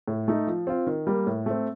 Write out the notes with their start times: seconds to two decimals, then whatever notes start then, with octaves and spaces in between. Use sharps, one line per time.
0.08 A2
0.28 A3 D#4
0.47 F3
0.67 C4 F4
0.87 D#3
1.07 G3 A#3
1.27 A2
1.46 A3 C4